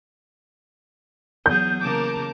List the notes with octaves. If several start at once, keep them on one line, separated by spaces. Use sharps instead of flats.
E2 F#3 G#4 G6
C#3 E3 A#3 A#4 A5 D6